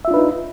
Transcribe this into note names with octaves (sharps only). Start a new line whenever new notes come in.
D4 D#4 F4 B4 E5